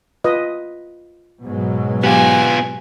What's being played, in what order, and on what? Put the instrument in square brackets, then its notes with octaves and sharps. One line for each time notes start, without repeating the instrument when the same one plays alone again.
[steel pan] F4 B4 D#5
[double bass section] G#2 B2 F#3
[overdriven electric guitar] B3 F4 [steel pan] G4 [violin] G#5